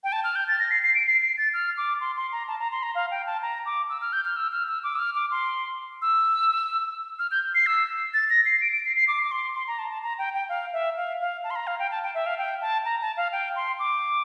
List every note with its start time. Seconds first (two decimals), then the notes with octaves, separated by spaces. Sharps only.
0.04 G5
0.12 A5
0.24 F6
0.36 G6
0.48 A6
0.59 A#6
0.71 C7
0.83 C7
0.95 D7
1.06 C7
1.22 C7
1.38 A6
1.54 F6
1.77 D6
2.01 C6
2.16 C6
2.32 A#5
2.48 A5
2.60 A#5
2.72 C6
2.83 A#5
2.95 F5
3.11 G5
3.27 A5
3.42 A#5
3.66 D6
3.90 E6
4.01 F6
4.13 G6
4.25 F6
4.36 E6
4.52 F6
4.68 E6
4.84 D6
4.95 E6
4.99 F6
5.15 D6
5.31 C6
6.02 E6
7.19 F6
7.31 G6
7.55 C7
7.66 E6
8.14 A6
8.30 A#6
8.45 C7
8.61 D7
8.72 D7
8.85 C7
8.96 C7
9.08 D6
9.23 D6
9.31 C6
9.55 C6
9.67 A#5
9.79 A5
9.91 A5
10.03 A#5
10.18 G5
10.34 G5
10.49 F5
10.73 E5
10.97 F5
11.21 F5
11.44 A5
11.51 C6
11.56 A#5
11.67 F5
11.79 G5
11.91 A5
12.03 G5
12.15 E5
12.26 F5
12.38 G5
12.62 A5
12.85 A#5
13.01 A5
13.17 F5
13.32 G5
13.56 C6
13.79 D6